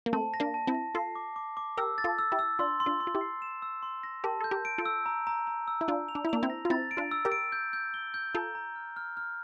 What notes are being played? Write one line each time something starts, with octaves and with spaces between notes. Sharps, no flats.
A#3
A3 C4 A5
A#6
A#3 D4
A5
C4 E4
A#6
F4 A4 C7
D6
D6
D6
G4 A#4 E6
A6
F4 A4
E6
E4 G4
E6
D4 F4 C6
C6
D4 F4
C6
F4
E4 G4
C7
E7
E6
C6
A#6
G4 A#4 A5
A4 G6
G4 A#4
D7
F4 A4
E6
A#5
A#5
A#5
E6
E4
D4 F4 E6
F7
D4
E4
A#3 D4 F7
C4 E4
A#6
F4
C4 E4 A6
D7
D4 F4
E6
G4 A#4
D7
G6
G6
G7
G6
F4 A4 A#5
A#5
F6
F6
F6